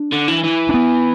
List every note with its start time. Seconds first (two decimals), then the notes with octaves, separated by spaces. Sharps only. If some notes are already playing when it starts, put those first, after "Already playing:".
Already playing: D4
0.12 D3
0.28 E3
0.44 E3
0.69 D4
0.74 B3